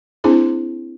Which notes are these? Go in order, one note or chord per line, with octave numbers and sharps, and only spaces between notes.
A#3 C4 D4 E4 G#4 C5